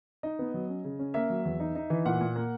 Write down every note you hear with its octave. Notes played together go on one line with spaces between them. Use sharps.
D#4 D#5
B3
F#3
C#4
C#3
C#4
A#3 E5
F#3
E2
D#4
D#4
E3
A#2 F#5
A#2
A#3